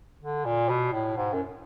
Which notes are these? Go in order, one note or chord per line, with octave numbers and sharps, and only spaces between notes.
D3
A#2
B2
A2
G#2
F#2